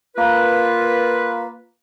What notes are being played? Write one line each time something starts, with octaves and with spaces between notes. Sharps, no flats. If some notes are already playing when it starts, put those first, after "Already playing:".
A#3 F4 B4